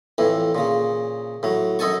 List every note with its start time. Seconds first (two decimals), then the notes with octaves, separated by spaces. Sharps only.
0.18 F2 A2 E3
0.55 A#2 C#3
1.43 A2 F#3
1.79 F#2 D#4 A4 G#5 A5 C#6